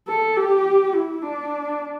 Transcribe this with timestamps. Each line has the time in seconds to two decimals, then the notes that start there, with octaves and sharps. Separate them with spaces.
0.08 A4
0.37 G4
0.94 E4
1.23 D4